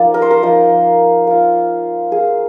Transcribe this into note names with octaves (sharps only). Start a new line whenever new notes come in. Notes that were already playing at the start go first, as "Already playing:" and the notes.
Already playing: F3 A#3 D#4 D5
A#4
C5
A#4
F3 A#3 D#4
A#3 F4
A#3 F4 G#4